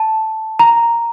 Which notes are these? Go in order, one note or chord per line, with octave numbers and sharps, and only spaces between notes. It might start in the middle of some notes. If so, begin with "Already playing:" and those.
Already playing: A5
A#5